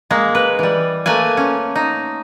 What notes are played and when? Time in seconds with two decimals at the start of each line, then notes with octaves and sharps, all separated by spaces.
0.10 G#3 A#3
0.35 B4
0.59 E3 G3
1.06 A3 A#3 B4 G#5
1.37 C#4
1.75 D#4